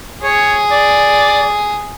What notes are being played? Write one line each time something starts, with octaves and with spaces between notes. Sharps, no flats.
G#4 C#5
D5